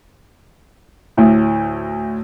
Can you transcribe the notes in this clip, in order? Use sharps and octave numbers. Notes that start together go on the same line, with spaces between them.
D2 A2